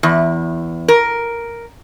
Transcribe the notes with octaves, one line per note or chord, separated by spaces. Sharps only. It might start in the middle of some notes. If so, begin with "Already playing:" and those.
E2
A#4